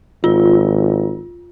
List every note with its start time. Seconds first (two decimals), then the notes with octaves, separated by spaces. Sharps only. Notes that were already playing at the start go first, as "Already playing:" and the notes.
0.24 G#1 F4